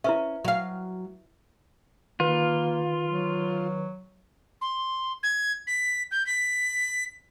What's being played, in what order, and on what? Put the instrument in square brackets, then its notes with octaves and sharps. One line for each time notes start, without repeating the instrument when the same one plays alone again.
[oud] C#4 [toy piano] E4 B4 E5
[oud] F#3 F5
[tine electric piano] D#3 B4 [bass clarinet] A#3 [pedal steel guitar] F4
[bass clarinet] F#3
[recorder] C6
G#6
B6
G6
B6